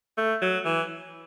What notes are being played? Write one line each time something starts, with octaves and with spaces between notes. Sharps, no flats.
A3
F#3
E3